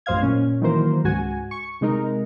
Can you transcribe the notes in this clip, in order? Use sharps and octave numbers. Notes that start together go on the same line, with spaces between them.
A1 F#2 C5 D#5 F5 G#6
A#2 C#4
D#3 E3 F#3 A#3 A#4 C5
C#2 G#2 F#4 G#5
C#6
C3 G#3 D#4 A#4